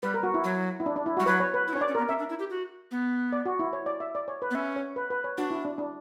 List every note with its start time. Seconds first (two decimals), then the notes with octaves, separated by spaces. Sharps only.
0.03 G3 B4
0.14 A#4
0.23 F#4
0.34 E4
0.44 F#3
0.80 E4
0.86 D4
0.96 D4
1.06 E4
1.17 F#4
1.20 G3
1.26 F#3 B4
1.40 C#5
1.54 B4
1.68 E4
1.73 C#4 D4 C#5
1.81 D5
1.88 C#4
1.95 B3 A#4
2.08 C#4 E5
2.19 D4
2.29 E4
2.39 G4
2.50 F#4
2.91 B3
3.32 D5
3.46 F#4
3.59 E4
3.73 C#5
3.86 D5
4.00 E5
4.15 D5
4.28 C#5
4.42 B4
4.51 B3
4.55 C#4 E5
4.76 C#5
4.96 B4
5.10 B4
5.24 C#5
5.38 D4 F#4
5.51 E4
5.65 D4
5.78 D4